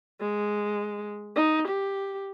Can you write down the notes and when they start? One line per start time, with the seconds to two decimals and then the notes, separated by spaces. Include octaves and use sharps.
0.20 G#3
1.36 D#4
1.68 G4